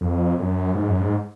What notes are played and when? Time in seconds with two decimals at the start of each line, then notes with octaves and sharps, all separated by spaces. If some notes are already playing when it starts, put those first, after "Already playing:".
0.01 F2
0.38 F#2
0.75 G#2
0.88 F#2
1.00 G#2